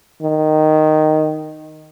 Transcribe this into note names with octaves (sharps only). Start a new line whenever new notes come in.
D#3